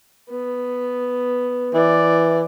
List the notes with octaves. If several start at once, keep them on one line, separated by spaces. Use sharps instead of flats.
B3
E3 D5